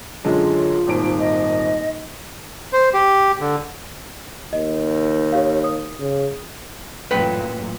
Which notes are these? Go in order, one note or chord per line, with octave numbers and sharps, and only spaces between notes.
F#2 D3 G#3 F4
D#1 G#1 D7
D#5
C5
G4
D3
D#2 D#5
G4 C#5 F5
D#6
C#3
A1 F#2 A#2 B4 F#5 G5